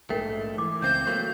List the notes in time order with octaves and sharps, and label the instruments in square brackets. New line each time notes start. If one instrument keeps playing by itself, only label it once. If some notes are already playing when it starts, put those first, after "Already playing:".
[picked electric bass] A#1 G#2 [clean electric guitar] A3 [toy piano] A#4 G5
[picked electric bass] E3 [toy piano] D6
[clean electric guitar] C#2 C4 [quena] G6
[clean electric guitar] F#3 A3 A#3 [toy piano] C#6